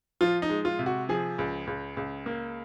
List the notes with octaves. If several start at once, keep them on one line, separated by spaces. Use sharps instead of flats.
F3 F4
D#4
G#3
F4
C3
F#4
F3 G#4
C#2
C#2
C#2
A#3